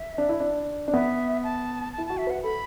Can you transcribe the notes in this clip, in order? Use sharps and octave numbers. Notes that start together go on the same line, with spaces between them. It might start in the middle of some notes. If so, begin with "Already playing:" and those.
Already playing: E5
D4
E4
D4
D4
B3 E5
A5
A5
E4
F#4 A5
E5
B4 F#5
A4 B5